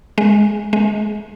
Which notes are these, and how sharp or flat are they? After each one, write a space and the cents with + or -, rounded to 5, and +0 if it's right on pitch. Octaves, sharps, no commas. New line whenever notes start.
G#3 +0
G#3 +20